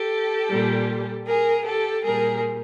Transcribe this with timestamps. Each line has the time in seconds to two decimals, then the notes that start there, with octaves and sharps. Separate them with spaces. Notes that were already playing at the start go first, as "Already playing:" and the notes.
Already playing: G4 A4
0.49 A#2 G3
1.26 G#4 A#4
1.65 G4 A4
2.03 A#2 G3 G#4 A#4